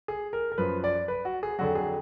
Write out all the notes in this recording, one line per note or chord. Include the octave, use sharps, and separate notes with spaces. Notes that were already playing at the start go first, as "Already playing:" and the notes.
G#4
A#4
A#4
F#2 F3 B4
D5
B4
F#4
G#4
F2 D3 F#3 F#4
G#4